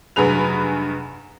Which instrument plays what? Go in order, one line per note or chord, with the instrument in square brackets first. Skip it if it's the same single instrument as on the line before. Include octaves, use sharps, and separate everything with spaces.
[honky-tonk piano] F1 G2 F#3 G#4 B4 F7